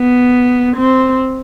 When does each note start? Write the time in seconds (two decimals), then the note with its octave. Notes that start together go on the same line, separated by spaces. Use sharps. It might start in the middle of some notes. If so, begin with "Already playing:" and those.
Already playing: B3
0.76 C4